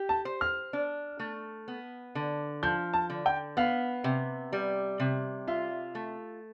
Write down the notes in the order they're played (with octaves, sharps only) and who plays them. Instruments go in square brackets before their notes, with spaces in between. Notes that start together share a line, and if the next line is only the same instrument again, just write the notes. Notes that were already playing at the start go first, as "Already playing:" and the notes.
Already playing: [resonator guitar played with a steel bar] G4
[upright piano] A5
[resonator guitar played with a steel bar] C5
[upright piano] F6
[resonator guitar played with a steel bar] D4
A3
B3
D3
[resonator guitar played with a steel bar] F3 [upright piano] G6
[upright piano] A5
[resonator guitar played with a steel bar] D3
[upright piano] G5
[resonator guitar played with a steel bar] B3 [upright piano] F5
[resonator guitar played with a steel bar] C3
G3
C3
[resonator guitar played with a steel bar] F4 [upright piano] E5
[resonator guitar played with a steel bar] A3